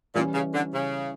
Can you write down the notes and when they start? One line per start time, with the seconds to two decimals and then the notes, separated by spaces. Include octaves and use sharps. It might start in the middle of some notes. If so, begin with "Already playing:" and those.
0.15 A#2 E3 G3 C#4 E4
0.34 C#3
0.54 D3
0.73 C#3